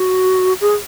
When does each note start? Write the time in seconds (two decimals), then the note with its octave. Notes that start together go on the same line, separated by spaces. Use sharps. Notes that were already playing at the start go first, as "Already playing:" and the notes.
Already playing: F#4
0.61 G#4